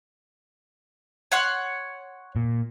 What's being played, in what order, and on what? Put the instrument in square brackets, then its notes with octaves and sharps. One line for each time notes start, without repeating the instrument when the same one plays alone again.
[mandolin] C#5 F#5 C6
[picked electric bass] A#2